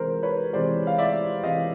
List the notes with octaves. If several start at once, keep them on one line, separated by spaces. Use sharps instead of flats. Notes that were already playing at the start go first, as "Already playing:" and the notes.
Already playing: C3 E3 G#3 A#4 C5
B4 C#5
C3 E3 G#3 C5 D5
F5
D5 E5
C3 E3 G#3 D#5 F5